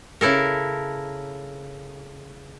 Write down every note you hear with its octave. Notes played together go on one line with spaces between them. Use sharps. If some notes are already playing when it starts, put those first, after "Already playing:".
C#3 E4 A4 A#4